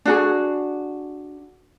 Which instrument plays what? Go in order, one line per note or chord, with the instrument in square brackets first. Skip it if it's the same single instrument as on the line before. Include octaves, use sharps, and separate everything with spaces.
[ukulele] D4 F#4 G#4